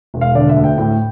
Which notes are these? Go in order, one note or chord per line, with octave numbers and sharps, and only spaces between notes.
E1
F5
D3 D5
E5
D2
G5
A2 G5